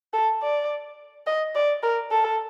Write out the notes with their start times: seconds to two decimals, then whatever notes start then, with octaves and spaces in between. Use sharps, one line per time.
0.13 A4
0.42 D5
1.27 D#5
1.55 D5
1.83 A#4
2.11 A4